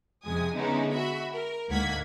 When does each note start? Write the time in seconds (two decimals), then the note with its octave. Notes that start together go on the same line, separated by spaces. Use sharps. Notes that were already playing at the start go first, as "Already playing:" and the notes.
0.25 F2 C3 G#3 G#5 D#6
0.54 D3 G#3 B3 C#4 D#4 E4
0.93 F#4 E5 B5
1.34 A#4
1.69 D2 G#2 A#3 F#5 G#6 B6